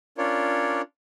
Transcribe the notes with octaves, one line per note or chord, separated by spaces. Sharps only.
C#4 D4 F4 A#4 C#5 D5